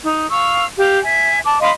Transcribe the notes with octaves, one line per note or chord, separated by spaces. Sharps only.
D#4
F5 C#6 E6
G4 F5
E5 G#5
A5 D6
D#5 F5 B5 C6